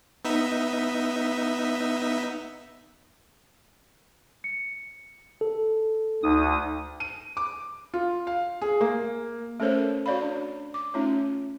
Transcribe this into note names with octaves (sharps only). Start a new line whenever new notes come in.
B3 D#4 E5
C#7
A4
D2 D#4 D#6
D#7
D6
F4
F5
G#4
A#3
A3 C#4 A4 A#4 C5 C#5
F#4 C#5 D5 F5 B5
D4
D6
A3 C#4 D#4 F4 C#5